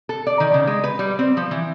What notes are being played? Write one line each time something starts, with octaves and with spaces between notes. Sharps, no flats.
A4
D5
D#3
C#3
G#3
B4
G3
C4
F3
E3